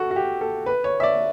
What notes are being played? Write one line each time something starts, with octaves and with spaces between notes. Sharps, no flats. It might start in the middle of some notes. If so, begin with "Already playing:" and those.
Already playing: F#4 A4
F#4
G4
A4
B4
C#5
E5
D5